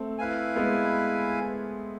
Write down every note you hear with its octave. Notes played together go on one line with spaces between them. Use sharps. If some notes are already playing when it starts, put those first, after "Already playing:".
Already playing: A3 C4
E4 B4 F5 G#5
G#3 B3